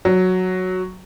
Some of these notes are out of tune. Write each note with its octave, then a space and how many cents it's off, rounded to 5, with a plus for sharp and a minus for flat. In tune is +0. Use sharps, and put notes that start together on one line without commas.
F#3 -5